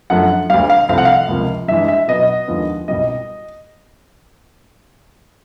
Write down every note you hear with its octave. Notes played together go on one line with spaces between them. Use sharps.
F#2 D3 F3 A3 F#5
D2 D3 G3 F5
F5
C2 C3 F3 A3 C4 F5
F#5
F5
C#2 C3 F3 A#3
G2 E3 G#3 E5
E5
B2 F#3 B3 D#5
D#2 D3 F3 G#3 B3
C2 B2 G3 D#5